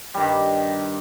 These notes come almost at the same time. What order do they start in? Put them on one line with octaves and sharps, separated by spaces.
G3 D#3 G2